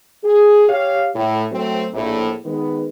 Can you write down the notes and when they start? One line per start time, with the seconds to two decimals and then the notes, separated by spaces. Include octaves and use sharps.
0.23 G#4
0.67 G4 C#5 F5
1.14 A2
1.51 F#3 A3 C4
1.93 A#1 A2
2.45 D#3 G#3 B3